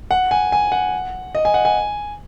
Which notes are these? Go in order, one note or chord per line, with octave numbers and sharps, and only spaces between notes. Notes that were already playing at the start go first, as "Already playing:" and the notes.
F#5
G#5
G#5
F#5
D#5
G#5
F#5
G#5